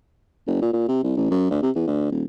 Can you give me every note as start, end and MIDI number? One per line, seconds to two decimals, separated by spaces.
0.47 0.62 30
0.62 0.73 46
0.73 0.87 46
0.88 1.02 48
1.03 1.15 36
1.17 1.30 33
1.31 1.46 42
1.51 1.61 38
1.62 1.70 48
1.75 1.83 40
1.87 2.10 38
2.11 2.23 27